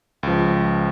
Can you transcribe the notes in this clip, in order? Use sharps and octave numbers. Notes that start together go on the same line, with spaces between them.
C#2 F3